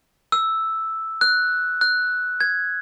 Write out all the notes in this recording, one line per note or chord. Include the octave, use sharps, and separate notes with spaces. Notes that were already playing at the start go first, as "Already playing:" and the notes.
E6
F#6
F#6
G#6